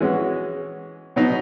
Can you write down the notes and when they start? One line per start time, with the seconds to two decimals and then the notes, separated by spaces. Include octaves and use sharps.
0.01 E3 G#3 C#4 F#4
1.16 B2 F#3 B3 D#4